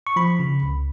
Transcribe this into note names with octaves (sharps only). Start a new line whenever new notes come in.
C#6
F3 B5
C#3
C#2